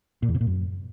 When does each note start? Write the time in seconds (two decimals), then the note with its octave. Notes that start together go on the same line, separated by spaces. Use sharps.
0.22 A#2
0.29 E2
0.35 C3
0.41 A#2
0.47 F#2